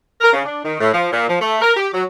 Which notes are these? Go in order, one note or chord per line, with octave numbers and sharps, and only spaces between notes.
A#4
C#3
D4
D#3
A2
F3
A#2
F3
A3
A#4
G4
F#3